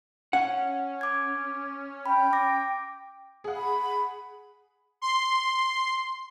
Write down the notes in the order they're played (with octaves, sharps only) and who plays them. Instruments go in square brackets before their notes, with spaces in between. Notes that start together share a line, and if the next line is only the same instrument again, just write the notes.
[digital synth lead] C#4 [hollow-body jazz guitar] F#5
[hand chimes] D6 G#6
[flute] G5 [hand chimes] B5
[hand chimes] D6 A#6
[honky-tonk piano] G#4 F#5
[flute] B5
[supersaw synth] C6